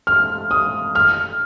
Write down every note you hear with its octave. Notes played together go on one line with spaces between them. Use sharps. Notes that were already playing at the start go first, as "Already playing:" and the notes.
F6
D#6
F6